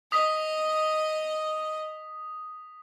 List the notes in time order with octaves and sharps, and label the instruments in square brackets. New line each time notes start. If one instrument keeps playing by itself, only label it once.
[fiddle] D#5 [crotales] D#6 B6